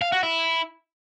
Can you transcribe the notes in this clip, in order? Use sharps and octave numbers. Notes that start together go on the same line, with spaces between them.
F5
F#4
E4